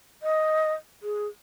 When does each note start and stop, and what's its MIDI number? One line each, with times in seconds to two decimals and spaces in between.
0.23 0.73 75
1.03 1.26 68